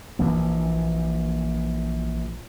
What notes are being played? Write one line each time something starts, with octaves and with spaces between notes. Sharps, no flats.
A#1 E3 A#3